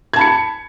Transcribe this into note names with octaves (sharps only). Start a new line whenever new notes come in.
A5 B5 G#6 C#7